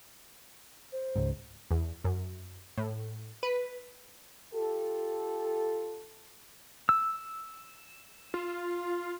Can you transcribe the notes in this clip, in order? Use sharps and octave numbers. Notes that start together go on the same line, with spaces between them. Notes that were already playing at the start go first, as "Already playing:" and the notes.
C5
C#2 G#2
E2
F#2
A2
B4
F4 G4 A4
E6
F4